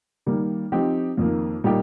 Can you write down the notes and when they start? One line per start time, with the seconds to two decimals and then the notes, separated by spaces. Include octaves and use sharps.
0.26 D#3 G3 A#3
0.72 F3 C4 D#4 G4
1.17 F2 D#3 A#3
1.64 A#2 G3 A#3 D#4 G4